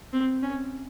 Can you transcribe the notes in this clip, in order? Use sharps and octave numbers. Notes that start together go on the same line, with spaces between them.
C4
C#4